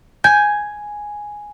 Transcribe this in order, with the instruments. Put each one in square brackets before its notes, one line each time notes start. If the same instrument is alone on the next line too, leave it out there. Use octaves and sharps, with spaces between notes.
[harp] G#5 [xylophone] G6